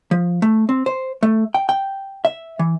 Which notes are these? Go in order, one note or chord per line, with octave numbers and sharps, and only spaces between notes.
F3
A3
C4
C5
A3
G5
G5
E5
E3